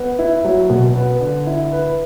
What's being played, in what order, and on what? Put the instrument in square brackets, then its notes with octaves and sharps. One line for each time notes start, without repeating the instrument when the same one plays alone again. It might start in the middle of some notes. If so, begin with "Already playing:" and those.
Already playing: [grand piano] B3
E4
F#3
B2
B3
D3
E4
B4